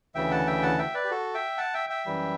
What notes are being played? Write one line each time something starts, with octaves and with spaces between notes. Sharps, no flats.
D2 C#3 E3 E5 G5
F#5 A5
E5 G5
F#5 A5
E5 G5
B4 D5
G4
F#4 A4
E5 G5
F#5 A5
E5 G5
E5 G5
F#2 E3 G3